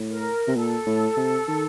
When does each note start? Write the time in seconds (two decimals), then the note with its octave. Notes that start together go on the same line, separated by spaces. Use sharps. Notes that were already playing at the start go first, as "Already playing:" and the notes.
Already playing: A2
0.10 A#4
0.48 C3
0.56 A#2 A4
0.86 A2
1.17 C3
1.48 D#3